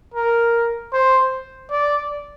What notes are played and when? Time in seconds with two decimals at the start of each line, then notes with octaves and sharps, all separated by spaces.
0.15 A#4
0.93 C5
1.71 D5